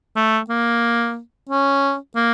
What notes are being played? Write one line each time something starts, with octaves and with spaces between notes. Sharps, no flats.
A3
A#3
C#4
A#3